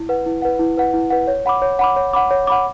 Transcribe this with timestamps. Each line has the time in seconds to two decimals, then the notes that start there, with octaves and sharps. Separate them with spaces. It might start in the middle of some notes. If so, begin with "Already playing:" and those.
Already playing: E4
0.09 B4 F#5
0.26 E4
0.42 B4 F#5
0.59 E4
0.77 B4 F#5
0.93 E4
1.10 B4 F#5
1.28 C#5
1.46 F#5 B5 D6
1.62 C#5
1.79 F#5 B5 D6
1.96 C#5
2.14 F#5 B5 D6
2.31 C#5
2.47 F#5 B5 D6